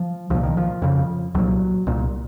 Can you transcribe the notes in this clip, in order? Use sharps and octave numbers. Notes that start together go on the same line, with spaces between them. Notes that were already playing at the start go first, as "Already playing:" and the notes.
Already playing: F3
C2 A#2 F3
D#3
F3
F2 C#3
C2 A#2 F#3
C2 A#2